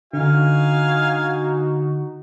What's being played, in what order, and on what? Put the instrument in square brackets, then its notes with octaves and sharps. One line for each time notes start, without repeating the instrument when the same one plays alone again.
[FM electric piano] D3 [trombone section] D#4 F#4 [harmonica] F5 G#5